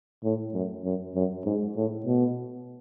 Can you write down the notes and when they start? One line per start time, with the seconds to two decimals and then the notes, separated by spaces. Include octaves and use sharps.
0.24 A2
0.54 F#2
0.84 F#2
1.15 F#2
1.45 G#2
1.76 A2
2.06 B2